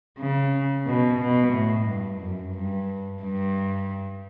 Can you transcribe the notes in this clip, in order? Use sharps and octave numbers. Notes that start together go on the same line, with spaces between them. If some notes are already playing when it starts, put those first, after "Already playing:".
C#3
B2
B2
A2
G2
F#2
G2
G2